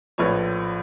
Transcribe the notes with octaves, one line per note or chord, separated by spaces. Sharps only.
A#1 A2 F3 B4 C#5